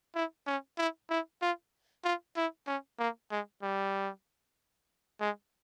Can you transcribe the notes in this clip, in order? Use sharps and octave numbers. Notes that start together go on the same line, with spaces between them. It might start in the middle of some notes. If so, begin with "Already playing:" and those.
E4
C#4
E4
E4
F4
F4
E4
C#4
A#3
G#3
G3
G#3